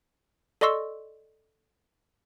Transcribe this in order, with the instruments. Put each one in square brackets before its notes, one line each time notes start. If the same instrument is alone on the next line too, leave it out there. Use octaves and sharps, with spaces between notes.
[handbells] A4 D5 D#5 C6 C#6 E6